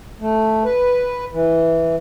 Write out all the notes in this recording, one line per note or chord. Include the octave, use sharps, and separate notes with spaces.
A3
B4
E3